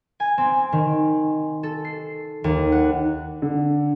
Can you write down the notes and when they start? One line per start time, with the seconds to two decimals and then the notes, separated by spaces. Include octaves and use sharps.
0.20 G#5
0.38 C4
0.72 D#3
1.63 A4
1.85 C7
2.44 D#2
2.72 F#5
3.42 D3